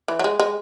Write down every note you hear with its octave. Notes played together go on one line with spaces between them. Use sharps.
E3
F#3
G#3
G#3